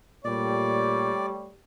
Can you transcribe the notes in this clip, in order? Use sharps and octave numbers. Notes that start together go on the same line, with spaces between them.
A#2 G3 A3 C#5 D5